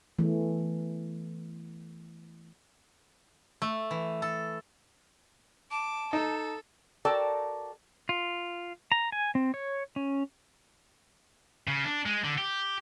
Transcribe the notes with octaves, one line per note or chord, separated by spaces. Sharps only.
E3 A3
A3
E3
A4
A5 D6
D#4 A4
F#4 A4 A#4 D5 G5 A5
F4
A#5
G#5
C4
C#5
C#4
C#3
D4
G#3
D3
G4